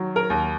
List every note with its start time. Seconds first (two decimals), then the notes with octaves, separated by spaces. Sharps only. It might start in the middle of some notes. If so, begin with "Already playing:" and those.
Already playing: D#3 F#3
0.16 A#4
0.30 D#2